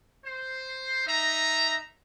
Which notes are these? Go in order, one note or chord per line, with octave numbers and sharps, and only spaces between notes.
C5
D#4 E5 A#5